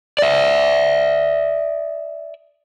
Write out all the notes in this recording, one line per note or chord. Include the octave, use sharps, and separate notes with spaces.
D5 E5